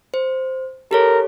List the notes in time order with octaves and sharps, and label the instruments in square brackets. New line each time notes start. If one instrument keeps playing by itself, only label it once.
[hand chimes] C5
[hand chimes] G4 A4 C#5 [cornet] A#4